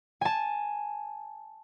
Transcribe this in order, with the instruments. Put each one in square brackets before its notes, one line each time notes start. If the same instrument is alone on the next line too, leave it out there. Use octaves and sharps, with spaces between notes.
[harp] G#5 A5